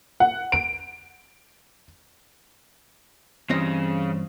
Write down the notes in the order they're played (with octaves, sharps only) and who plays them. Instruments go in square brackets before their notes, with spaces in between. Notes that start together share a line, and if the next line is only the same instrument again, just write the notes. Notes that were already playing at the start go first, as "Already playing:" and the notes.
[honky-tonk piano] F#5
D7
[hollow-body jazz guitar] G2 C4 D#5 [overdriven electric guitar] C#3 [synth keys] E3